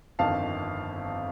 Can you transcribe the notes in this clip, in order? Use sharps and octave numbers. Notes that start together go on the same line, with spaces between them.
G1 F2 D#3 F5 A5